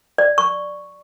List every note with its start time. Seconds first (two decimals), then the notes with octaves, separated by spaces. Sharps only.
0.18 D5
0.38 C#6